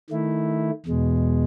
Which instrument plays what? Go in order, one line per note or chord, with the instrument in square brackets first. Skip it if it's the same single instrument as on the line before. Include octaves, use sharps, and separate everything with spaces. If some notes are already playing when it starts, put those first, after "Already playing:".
[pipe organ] D#3 A3 E4
E2 B2 G#3